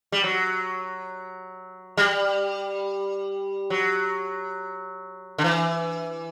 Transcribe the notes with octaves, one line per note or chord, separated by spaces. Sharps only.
G3
F#3
G3
F#3
D3
E3